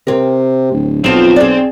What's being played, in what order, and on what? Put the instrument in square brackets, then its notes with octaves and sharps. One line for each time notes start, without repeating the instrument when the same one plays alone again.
[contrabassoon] C3 [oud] C4 A#4
[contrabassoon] D1
[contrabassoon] B1 [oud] F3 F4 [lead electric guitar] C4
[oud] G#4 D5